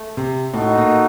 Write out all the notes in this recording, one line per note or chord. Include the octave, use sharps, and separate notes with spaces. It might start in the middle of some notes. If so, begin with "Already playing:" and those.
Already playing: A3
C3
A2 D#4 F#4 A4 D#5 F#5
A#2